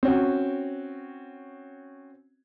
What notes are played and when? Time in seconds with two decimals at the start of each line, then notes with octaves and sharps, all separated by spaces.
0.03 C4 C#4 F#4